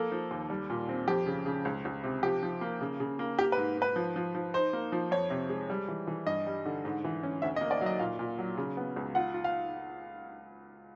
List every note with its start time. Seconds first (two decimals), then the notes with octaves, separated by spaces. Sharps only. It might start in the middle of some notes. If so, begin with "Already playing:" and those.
Already playing: F3 A#3 A4
0.12 F3
0.31 D#2
0.50 G3
0.70 A#2
0.89 C4
1.08 F2 G4
1.26 C#3
1.46 C#3
1.65 C#2
1.85 C#2
2.04 C3
2.23 F3 G4
2.43 F3
2.61 A#3
2.81 C#3
3.00 C#3
3.19 A#3
3.38 A#3 G4
3.52 B4
3.57 G#2
3.77 G#2 B4
3.96 F3
4.16 F3
4.35 F3
4.54 D#4 C5
4.73 A#3
4.92 F3
5.11 F2 C#5
5.30 C3
5.49 G#3
5.70 G3
5.88 E3
6.07 E3
6.26 G2 D#5
6.47 G3
6.66 D3
6.85 G#2
7.04 E3
7.23 C#4
7.42 D2 E5
7.56 D#5
7.61 A#3
7.71 D5
7.81 F#3 D#5
7.99 A#2 F5
8.19 A#2
8.39 F#3
8.57 C#3
8.77 B3
8.96 C#2
9.15 F4 F#5
9.34 F4
9.44 F5